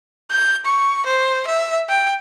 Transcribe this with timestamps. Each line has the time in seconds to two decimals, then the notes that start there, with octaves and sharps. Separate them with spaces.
0.31 G6
0.66 C#6
1.06 C5
1.47 E5
1.89 G5